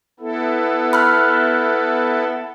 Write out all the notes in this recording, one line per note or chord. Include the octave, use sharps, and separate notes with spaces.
B3 E4 A4
B5 F6 F#6